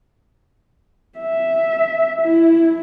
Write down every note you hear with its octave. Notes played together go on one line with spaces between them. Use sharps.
E5
E4